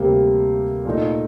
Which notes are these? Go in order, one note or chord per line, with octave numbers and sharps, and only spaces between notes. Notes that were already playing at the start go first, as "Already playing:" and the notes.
Already playing: D2 C3 G3 A#3
A#2 A3 D#4